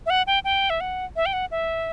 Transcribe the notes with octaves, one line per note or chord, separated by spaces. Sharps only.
E5
F#5
G5
G5
E5
F#5
E5
G5
F#5
E5